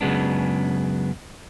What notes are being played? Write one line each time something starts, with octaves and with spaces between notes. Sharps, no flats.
F#2 C#3 G#3 B3 D4